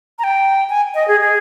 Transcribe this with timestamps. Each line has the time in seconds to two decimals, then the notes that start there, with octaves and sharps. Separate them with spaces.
0.19 A#5
0.24 G5
0.70 G#5
0.95 D#5
1.08 G#4
1.21 G#4